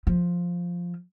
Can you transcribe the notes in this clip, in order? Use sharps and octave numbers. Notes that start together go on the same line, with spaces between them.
F3